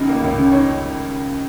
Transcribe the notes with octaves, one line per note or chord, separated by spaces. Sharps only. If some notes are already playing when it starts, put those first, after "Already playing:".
Already playing: C#2 C#3 D#4
A#3
C#2
C#3
D#4 C#5